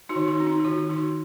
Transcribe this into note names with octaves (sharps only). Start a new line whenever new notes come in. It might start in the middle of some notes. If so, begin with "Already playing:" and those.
D#4 F#4
D#3
D#4 F#4
C4
D#4
F#4
D#3 F4
D#3 D#4 F#4